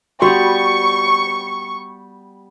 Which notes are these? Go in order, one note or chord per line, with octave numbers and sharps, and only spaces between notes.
G3 B3 F#4 C#6